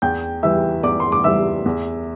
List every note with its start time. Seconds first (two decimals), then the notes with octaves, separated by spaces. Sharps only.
0.02 E2 G5 G6
0.43 E3 G3 E5 E6
0.83 E2 D5 D6
1.00 C6
1.12 D6
1.24 E3 G3 E5 E6
1.66 E2